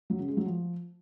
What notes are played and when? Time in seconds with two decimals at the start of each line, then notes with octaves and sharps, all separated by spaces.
0.10 F#3
0.19 C#3
0.28 G#3
0.37 F#3
0.46 F3